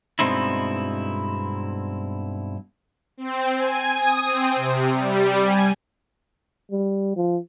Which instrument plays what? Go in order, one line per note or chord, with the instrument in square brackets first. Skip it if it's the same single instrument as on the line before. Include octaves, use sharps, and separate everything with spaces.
[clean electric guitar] G2 B2 G#3 C4 D#4 E4
[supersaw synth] C4
G#5
D#6
C4
C3
G3
G#5
[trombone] G3
F3